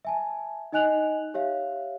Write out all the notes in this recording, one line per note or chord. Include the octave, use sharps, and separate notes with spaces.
E5 G#5 A5
D#4 D#5 G#5 F#6 F7 F#7
G4 C#5 E5 F5